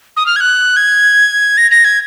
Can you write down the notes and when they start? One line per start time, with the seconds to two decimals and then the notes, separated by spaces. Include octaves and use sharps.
0.17 D#6
0.26 F6
0.36 G#6
0.41 F#6
0.77 G#6
1.58 A#6
1.71 A#6
1.85 G#6